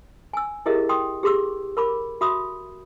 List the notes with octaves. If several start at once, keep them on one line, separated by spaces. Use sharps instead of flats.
G#5 E6
E4 G4 G#4 A#4 D#5 E5
G5 C6 D#6
G4 G#4 C6 D6 E6
A#4 B5 D6
F#4 E5 B5 D#6